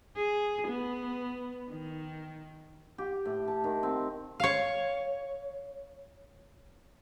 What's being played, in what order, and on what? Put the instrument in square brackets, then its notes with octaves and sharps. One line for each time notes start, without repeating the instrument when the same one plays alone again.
[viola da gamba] G#4
B3
D#3
[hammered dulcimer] G4
A2
A5
D#3
C4
[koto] C#5 F5